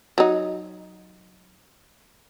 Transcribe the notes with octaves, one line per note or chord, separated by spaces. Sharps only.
F#3 D#4